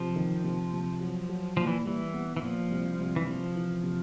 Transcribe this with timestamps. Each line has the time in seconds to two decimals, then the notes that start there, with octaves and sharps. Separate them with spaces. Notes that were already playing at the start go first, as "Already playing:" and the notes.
Already playing: C3 F3
0.16 D#3
0.44 C3
0.73 C3
1.00 F#3
1.29 F#3
1.57 A#2 F3
1.67 E3
1.86 E3 G3
2.14 B3
2.37 E3
2.42 A#2 F3
2.70 C2
2.99 C2
3.16 E3
3.27 C3 F3
3.55 E3
3.83 C3